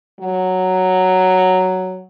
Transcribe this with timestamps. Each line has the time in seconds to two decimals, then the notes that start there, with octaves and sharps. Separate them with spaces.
0.20 F#3